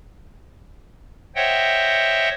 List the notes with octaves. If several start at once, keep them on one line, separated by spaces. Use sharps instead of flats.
C5 C#5 D#5 E5 F#5 G5